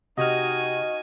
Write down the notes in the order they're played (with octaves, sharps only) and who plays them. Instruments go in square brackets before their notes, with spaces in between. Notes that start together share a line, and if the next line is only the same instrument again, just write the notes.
[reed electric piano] C3 G4 G5 [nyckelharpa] D#4 G#5 [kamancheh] F#4 [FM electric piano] D#5 F6